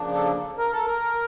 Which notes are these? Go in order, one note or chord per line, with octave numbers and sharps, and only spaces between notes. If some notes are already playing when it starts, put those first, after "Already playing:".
Already playing: C#3 F3 A#3 D4
A4
A#4
A4
A#4